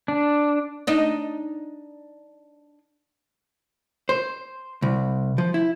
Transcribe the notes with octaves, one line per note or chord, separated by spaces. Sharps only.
D4
D4 D#4
C5
C2
F3
E4